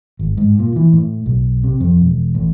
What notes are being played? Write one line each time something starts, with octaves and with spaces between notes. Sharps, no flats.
G#1
G#2
A#2
E3
A2
B1
C3
F2
E1
A1